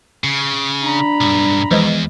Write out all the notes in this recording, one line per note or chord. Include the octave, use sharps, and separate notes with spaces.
C#3
D4 A#5 B5
B1 G2
E2 E3 F3 G#3